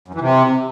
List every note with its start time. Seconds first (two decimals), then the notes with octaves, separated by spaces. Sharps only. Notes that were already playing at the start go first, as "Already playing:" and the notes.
0.08 F#2
0.15 E3
0.21 C3